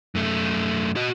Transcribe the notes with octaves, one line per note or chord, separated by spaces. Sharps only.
F#2 A3
F#4 D#5